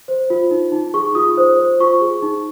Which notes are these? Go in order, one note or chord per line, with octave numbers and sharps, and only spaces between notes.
C5
F4
D#4
D#4
G#4 C#6
F4 D#6
C5
C5
F4 C#6
G#4
D#4